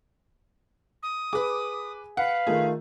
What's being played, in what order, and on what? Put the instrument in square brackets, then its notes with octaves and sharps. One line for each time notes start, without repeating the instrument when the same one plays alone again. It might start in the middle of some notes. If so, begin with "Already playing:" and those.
[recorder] D#6
[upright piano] G#4 [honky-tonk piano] B4 D6
[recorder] B4 [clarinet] F5 [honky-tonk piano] F#5
[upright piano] D#3 A3 F4 [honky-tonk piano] G#4